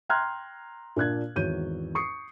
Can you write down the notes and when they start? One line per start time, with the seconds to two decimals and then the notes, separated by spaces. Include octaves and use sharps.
0.09 G5 A#5 C6 F6 F#6 G#6
0.96 A#2 D4 F#6 G#6
1.36 G#1 E2 F#4 C#5 G6 D#7
1.95 C#6 D#6 C7 C#7